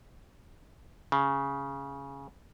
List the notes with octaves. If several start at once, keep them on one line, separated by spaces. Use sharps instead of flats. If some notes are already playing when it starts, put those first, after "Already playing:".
C#3